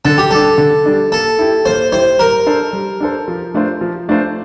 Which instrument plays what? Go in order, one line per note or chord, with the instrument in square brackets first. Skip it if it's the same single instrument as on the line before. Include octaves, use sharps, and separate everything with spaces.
[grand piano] D3 [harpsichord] A4
[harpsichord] G4
[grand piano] G3 D4 [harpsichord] A4
[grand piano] D3
G3 D4
[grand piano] A#3 [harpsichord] A4
[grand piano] E4 G4
[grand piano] A#3 [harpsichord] C5
[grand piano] E4 G4 [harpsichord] C5
[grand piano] G3 [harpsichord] A#4
[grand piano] D4 A4 C5
G3
D4 A4 C5
F3
A3 D4 F4 C5
F3
A3 D4 F4 C5